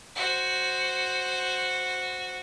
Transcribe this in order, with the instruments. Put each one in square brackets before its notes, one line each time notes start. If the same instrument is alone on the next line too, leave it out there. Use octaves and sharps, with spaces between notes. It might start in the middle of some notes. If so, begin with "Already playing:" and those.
[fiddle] F#4 C5